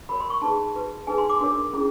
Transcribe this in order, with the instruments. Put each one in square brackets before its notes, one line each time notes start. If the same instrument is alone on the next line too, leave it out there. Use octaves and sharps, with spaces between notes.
[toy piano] F#4 A#4 C#5 B5
C6
C#6
D#4 G#4 B4 A5
F#4 B4
D#4 G#4 B4 G#5
C6
D6
D4 F#4 A#4 C#5
C#4 E4 G#4